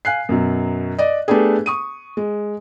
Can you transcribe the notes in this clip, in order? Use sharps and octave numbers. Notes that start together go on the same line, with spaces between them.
F5 G#5 F#6 C7
F#2 B2 F#3
D5 D#5
A3 B3 D4 G4 G#4
C#6 D#6 D#7
G#3